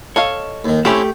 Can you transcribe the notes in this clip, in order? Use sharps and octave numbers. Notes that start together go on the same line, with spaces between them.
A4 C#5 D#5 F5
D#2 D#3
A3 C4 C#4 E4 G4 G5